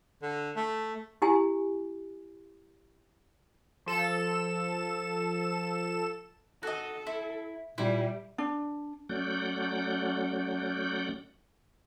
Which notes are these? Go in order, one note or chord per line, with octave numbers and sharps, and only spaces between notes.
D3
A3
E4 G4 G#5
F3 A4 E7
F#4 A4 D#5
E4
A#2 G3 E4
D4
F#3 A3 C#4 D5 F#5 G6